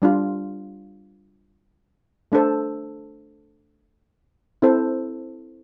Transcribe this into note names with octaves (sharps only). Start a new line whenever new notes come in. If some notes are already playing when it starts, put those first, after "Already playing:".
G3 D4 F4
A3 D4 A4 C5
C4 E4 A4 C5